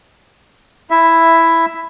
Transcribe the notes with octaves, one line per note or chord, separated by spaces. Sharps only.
E4 E5